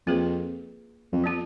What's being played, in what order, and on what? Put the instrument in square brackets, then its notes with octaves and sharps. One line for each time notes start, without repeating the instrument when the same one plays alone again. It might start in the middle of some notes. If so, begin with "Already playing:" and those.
[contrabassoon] F2 [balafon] A#3 F4 G#4 B4
[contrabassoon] F2
[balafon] F3 B3 F4